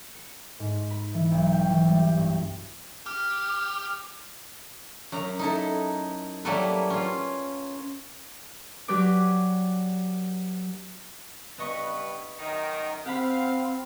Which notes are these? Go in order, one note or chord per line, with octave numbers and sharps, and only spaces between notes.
C#7
G#2
B5
E3
B1
G5
E3
G3
G4
G2
G4 F6
F#2 A#5
D#4 E4 A4
F#3 G3 A#3 E4 A4 B4
C#4 F4
F#3 G4 B4 D5 D6
G2 B3 B4 D#5 C#6
F#2 D#3 A#4
C4 G4 F5 F#5 B5